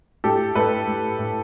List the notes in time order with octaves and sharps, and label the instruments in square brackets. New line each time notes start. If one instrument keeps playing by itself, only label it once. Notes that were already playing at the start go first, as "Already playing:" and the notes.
[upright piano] A2 G4 A4
A2 A4 B4
A2
A2